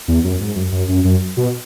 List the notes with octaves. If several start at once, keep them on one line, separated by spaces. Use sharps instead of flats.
E2
F#2
G#2
F#2
F#2
F#2
F#2
B2